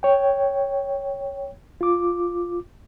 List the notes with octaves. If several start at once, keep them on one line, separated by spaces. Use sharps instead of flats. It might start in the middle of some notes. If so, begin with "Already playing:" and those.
C#5 G5
F4 D6